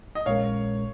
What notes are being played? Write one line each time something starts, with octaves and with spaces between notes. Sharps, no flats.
D#5
A#1 A#2 G#3 C#4 A#4 C#5 F5